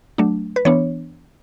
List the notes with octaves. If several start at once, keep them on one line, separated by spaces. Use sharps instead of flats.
F#3 A3 D4
B4
E3 B3 D4 C#5